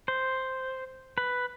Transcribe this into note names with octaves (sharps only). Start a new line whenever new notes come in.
C5
B4